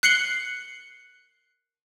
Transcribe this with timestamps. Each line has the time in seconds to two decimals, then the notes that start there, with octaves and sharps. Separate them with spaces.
0.03 F#6 C7 C#7 F#7 G7